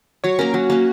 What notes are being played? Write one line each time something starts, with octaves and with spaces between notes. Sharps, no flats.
F#3 C#5
A#3 C#4 A#4
F#3 F#4
A#3 C#4